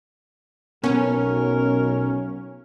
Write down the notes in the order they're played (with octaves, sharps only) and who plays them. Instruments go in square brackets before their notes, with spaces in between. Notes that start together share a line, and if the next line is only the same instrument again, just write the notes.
[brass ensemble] B1 [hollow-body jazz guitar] B2 [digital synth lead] C#4 [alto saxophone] A#4